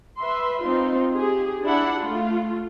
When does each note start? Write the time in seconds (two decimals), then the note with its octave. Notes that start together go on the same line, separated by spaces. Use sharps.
0.18 B4 E5 C6
0.62 C4 D#4 F4 C6
1.15 G4 G#4
1.64 D4 E4 F#5
2.00 A3 F4